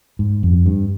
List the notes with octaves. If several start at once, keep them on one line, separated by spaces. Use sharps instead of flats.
G#2
F2
G2